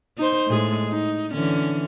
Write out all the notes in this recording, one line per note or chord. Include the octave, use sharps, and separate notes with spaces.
D#4 C5
A2 G#3 G#4
D#4
D3 E3 C#4